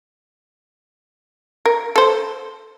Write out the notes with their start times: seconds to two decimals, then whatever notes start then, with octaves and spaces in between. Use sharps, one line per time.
1.66 A#4
1.96 A4 C5